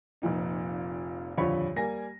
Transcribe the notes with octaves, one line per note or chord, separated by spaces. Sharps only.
F1 F2 A#2 D#4
D#1 F2 D3 F4 C#5 B5
G3 A#3 G#5 A#6